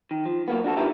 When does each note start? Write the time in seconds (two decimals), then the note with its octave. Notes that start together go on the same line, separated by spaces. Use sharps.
0.11 D#3
0.26 F3
0.48 F#3 A#3 B3
0.64 D4 F#4 A4
0.77 D#4 F4 G4 A#4 B4 E5